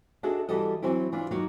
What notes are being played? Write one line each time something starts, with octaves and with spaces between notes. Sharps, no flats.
D4 F#4 G#4 A4 D#5 E5
E3 G3 F#4 A4 D#5
E3 F#3 C4 E4
E3 D4 F4
D#3 F#3 A#3